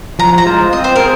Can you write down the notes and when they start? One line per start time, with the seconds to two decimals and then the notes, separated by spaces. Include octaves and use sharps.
0.19 F3 A#5
0.38 A#5
0.46 G#3 F4 C5
0.73 C4 D#5
0.84 C5
0.96 G#4 A#4 C5